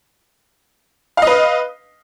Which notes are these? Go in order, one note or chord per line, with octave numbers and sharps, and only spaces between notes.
B4 D#5 F5